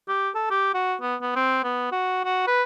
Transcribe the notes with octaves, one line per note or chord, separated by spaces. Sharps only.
G4
A4
G4
F#4
B3
B3
C4
B3
F#4
F#4
B4